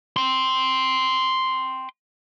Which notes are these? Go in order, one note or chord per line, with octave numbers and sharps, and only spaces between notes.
G5 C6